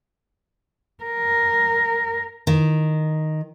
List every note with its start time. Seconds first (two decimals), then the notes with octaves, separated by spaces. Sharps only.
1.04 A#4
2.47 D#3